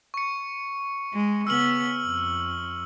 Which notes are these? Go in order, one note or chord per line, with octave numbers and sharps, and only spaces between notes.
C#6 C#7
G#3
C#3 B3 E6 F6 F#7
F2